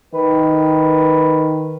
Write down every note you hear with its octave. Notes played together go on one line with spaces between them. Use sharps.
D#3 B4